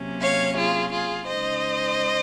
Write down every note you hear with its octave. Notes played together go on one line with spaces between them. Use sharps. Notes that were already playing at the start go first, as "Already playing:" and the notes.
Already playing: C3 F#3 A#3 C#4
C#5 F5
F4 G#4
F4 G#4
C#3 G#3 D#4 C5 D#5